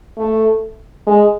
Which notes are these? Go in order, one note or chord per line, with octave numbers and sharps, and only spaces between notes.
A3
G#3